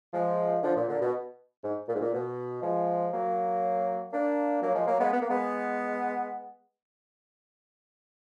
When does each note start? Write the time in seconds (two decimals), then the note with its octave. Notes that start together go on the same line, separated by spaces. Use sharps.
0.13 F3 G#3
0.63 D3 F3
0.75 A#2
0.88 A#2 D3
1.01 B2
1.63 G#2
1.88 A#2
1.95 G#2
2.01 A#2
2.13 B2
2.62 F3 G#3
3.12 F#3 A#3
4.12 A#3 D4
4.62 F#3 A#3
4.74 F3 G#3
4.86 F#3 A#3
5.00 G#3 B3
5.12 B3
5.21 A#3
5.29 G#3 B3